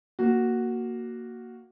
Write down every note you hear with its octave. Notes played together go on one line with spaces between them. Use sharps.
A#3 F#4